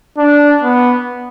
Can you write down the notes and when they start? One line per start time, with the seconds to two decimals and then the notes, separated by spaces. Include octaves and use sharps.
0.18 D4
0.63 B3